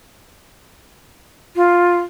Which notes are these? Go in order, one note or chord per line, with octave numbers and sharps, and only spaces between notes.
F4